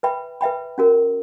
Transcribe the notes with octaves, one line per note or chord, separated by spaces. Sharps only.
B4 E5 G5 B5
B4 E5 G5 B5
C#4 F#4 A#4